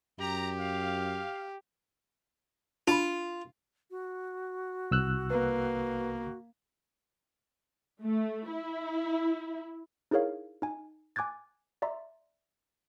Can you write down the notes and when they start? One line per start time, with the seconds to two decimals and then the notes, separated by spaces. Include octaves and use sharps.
0.20 F#2 G4 A#5
0.59 F5
2.88 D4 F4 B5
3.91 F#4
4.91 C2 E6 F#6
5.30 A#3 B4
8.01 A3
8.49 E4
10.11 D#4 E4 G#4 A#4 C#5 F5
10.62 D#4 G#5
11.16 G#5 D6 F#6 G#6 A6
11.82 D5 E5 A#5 C6